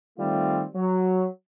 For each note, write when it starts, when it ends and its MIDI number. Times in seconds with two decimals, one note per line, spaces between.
0.19 0.64 51
0.19 0.64 55
0.19 0.64 57
0.19 0.64 60
0.19 0.64 65
0.75 1.27 54